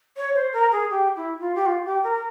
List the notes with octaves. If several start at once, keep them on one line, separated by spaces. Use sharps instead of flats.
C#5
C5
A#4
G#4
G4
E4
F4
G4
F4
G4
A#4